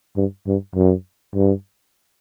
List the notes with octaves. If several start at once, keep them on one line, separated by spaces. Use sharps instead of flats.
G2
G2
F#2
G2